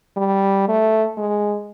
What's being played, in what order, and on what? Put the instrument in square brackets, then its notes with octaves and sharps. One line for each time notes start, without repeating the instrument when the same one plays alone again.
[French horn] G3
A3
G#3